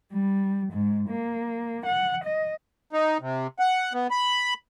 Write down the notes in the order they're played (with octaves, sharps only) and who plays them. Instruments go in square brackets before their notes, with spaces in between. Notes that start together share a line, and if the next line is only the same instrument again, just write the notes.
[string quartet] G3
G#2
A#3
F#5
D#5
[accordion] D#4
C3
F#5
B3
B5